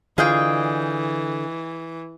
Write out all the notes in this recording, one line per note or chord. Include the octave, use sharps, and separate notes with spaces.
D3 E3 F4 G#4 D#5 F5 G5